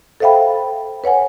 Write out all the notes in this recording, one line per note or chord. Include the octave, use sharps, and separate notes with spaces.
A4 C5 E5 F5 G5 B5
B4 C#5 F#5 G#5